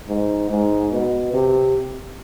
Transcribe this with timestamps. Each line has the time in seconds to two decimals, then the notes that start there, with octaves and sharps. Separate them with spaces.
0.08 G#2
0.50 G#2
0.92 B2
1.33 C3